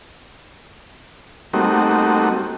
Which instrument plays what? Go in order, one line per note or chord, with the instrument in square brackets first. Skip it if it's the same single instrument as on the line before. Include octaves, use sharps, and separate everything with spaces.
[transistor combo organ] G3 A3 A#3 C4 D#4 F#4